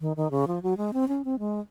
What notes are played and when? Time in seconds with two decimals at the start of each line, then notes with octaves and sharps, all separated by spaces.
0.01 D#3
0.17 D#3
0.31 C#3
0.47 F3
0.63 F#3
0.77 G#3
0.93 C4
1.08 C#4
1.25 C4
1.39 G#3